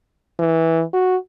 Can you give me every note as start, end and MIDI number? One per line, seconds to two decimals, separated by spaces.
0.39 0.83 52
0.93 1.16 66